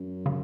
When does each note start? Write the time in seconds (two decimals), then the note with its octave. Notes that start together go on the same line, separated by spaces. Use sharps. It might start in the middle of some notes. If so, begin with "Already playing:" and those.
Already playing: F#2
0.26 C#3